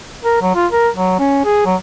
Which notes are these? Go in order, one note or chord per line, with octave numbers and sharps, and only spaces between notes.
A#4
F#3
F4
A#4
F#3
C#4
G#4
F#3